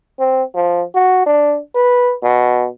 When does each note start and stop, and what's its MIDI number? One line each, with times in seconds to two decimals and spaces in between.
0.19 0.43 60
0.55 0.83 53
0.95 1.23 66
1.26 1.58 62
1.75 2.15 71
2.23 2.67 47